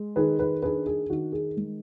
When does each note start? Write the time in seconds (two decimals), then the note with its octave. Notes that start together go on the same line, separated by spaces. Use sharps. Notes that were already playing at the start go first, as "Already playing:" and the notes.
Already playing: G#3
0.16 D#3 G#4 B4
0.39 G#4 B4
0.63 D4 G#4 B4
0.86 G#4
1.10 D#3 F#4
1.33 G#4
1.57 G#3